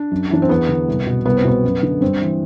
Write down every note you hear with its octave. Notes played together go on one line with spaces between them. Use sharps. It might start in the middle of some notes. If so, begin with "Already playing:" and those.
Already playing: D4
F#2
E3 D4
C4
E2 B3
D3
C2
B2
C2 B3
C4
B2 B3
F#2
D3
G2 C4
E3